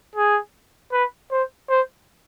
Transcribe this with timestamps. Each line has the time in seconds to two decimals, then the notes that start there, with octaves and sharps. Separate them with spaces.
0.15 G#4
0.92 B4
1.31 C5
1.69 C5